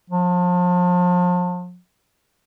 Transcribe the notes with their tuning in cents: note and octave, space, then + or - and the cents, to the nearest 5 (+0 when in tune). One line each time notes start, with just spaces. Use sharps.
F3 +35